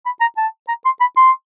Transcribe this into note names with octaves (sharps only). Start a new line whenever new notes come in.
B5
A#5
A5
A#5
C6
B5
C6